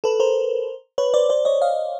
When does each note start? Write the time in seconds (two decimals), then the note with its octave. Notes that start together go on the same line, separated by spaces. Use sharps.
0.04 A4 B4
0.20 A#4 C5
0.98 B4 C#5
1.14 C5 D5
1.30 C5 D5
1.45 C#5 D#5
1.62 D#5 F5